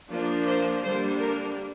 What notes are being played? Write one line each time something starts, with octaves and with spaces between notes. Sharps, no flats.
F3 A#3 D4
C5
D3 G3 A#3 D4 C5
A#4